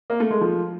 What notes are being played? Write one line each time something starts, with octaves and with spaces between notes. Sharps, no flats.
A#3
A3
G#3
F3